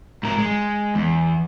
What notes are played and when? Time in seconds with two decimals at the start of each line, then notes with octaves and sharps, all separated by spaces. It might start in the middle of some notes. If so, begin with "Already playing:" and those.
0.23 G#2 A#4
0.38 G#3
0.95 E2